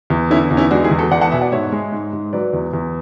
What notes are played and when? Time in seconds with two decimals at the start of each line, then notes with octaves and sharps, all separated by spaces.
0.10 E2
0.30 D3 C#4 E4
0.51 E2
0.57 C#4 E4
0.71 G#3 D4 F#4
0.84 E4 G#4
0.91 E2
0.98 F#4 A4
1.11 E2 D5 F#5
1.21 F#5 A5
1.32 B2 E5 G#5
1.41 D5 F#5
1.52 G#2 C#5 E5
1.72 G#3
1.92 G#2
2.13 G#2
2.33 F#3 B4 D5
2.53 E2
2.73 E2